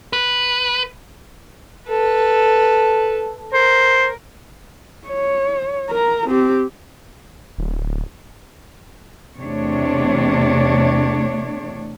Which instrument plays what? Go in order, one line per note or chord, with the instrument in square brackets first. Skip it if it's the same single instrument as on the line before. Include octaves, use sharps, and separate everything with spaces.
[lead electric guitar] B4
[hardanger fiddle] A4 B4
[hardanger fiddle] A#4 [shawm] C5
[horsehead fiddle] C#5
A#4 A#5
C4 G4
[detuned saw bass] D1
[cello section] E2 C3 A3 D4 C#5